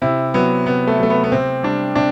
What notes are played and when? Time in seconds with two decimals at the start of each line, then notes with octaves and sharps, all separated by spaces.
0.02 C3 E4
0.34 F#3 B3
0.66 C3 B3
0.87 A3
0.99 F#3 A3
1.10 B3
1.24 B3
1.32 C3 C4
1.63 G3 D4
1.95 C3 D4